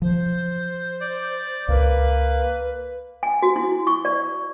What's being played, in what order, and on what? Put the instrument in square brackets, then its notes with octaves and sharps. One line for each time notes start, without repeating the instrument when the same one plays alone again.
[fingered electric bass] F3 [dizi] C5
[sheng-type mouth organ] D5
[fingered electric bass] C#2 [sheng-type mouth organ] A#3 [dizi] B4
[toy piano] G#5
F#4
E4
C#6
D5